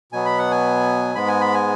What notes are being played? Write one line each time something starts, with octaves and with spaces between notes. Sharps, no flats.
B2 F#3 B3 G#5
B5
F#5
G#5
G#2 G#3 B3 B5
G#5
B5
G#5